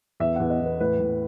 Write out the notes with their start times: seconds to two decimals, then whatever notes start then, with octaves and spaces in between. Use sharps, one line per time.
0.20 E2 E5
0.36 E2 F#5
0.50 D#5
0.61 E2
0.66 B4
0.80 A2 B4
1.00 A2